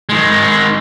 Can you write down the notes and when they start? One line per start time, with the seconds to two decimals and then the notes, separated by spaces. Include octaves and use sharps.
0.09 D#3 G#3